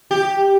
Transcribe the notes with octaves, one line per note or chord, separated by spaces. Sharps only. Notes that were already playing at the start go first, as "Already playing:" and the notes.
G4